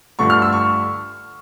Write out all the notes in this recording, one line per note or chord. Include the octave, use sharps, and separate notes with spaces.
G2 D3 F3 A3 C#6
F6
E6
C#6